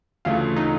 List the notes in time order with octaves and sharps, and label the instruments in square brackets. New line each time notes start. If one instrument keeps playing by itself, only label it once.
[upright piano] D2 C#3 E3 A3 [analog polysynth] F4
[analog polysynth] D#4